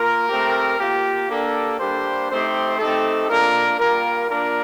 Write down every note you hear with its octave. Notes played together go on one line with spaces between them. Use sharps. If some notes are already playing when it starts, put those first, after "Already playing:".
Already playing: A#3 F4 A#4
A3 C4 G4
A#3 F4 G4
A#3 D4 G4 A4
G3 A#3 D4 G4 C5
A3 C4 D#4 G4 C5
A3 C4 D#4 G4 A4
A#3 D4 F4 A#4
G3 A#3 F4 A#4
A#3 D4 F4 A#4